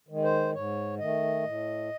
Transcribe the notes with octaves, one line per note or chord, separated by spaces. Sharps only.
D#3 G#3
C5
G#2 C#5
D#3 A3 D#5
A2